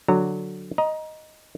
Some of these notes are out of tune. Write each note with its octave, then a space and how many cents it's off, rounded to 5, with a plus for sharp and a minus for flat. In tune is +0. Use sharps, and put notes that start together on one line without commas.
D3 +0 F#3 +0 A#5 -30
D#5 +0 A#5 +20